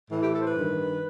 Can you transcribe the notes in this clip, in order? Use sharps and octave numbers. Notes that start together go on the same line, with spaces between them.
A2 E3
G4
A4
C5
B4
G2 D#3